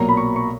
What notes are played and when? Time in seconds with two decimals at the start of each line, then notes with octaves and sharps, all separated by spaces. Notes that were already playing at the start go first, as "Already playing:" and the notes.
Already playing: B1 A#2 F#3 A#3 A#5
0.09 B5
0.17 C#6
0.36 C#6